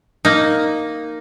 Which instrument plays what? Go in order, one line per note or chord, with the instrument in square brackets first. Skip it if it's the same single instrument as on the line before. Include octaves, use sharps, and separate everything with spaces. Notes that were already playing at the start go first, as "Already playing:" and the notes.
[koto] A#3 D#4